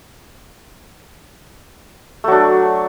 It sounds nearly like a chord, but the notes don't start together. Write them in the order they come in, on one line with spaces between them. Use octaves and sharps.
A3 F#3 D4